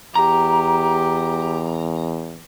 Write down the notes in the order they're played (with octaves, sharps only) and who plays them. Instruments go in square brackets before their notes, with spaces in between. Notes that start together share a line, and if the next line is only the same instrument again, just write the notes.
[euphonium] E2 [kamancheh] G4 [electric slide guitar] A#5